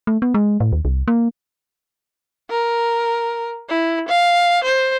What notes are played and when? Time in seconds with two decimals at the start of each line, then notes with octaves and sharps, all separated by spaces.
0.07 A3
0.22 B3
0.34 G#3
0.60 A2
0.72 D#2
0.85 C2
1.08 A#3
2.50 A#4
3.69 E4
4.08 F5
4.64 C5